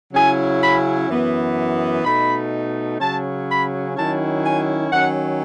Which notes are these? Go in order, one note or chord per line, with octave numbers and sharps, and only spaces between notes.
C#3 F#3 C#4 E4 G#5
B5
F#2 E3 B3
B2 A3 D#4 B5
C#3 F#3 C#4 A5
B5
D#3 F#3 C#4 E4 A5
G#5
D#3 F#3 C#4 F#5